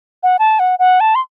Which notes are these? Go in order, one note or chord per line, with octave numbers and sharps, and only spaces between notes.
F#5
A5
F#5
F#5
A5
C6